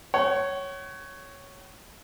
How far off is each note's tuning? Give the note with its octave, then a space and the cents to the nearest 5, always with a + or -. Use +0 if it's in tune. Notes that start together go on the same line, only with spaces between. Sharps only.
C#5 +0 F#5 +45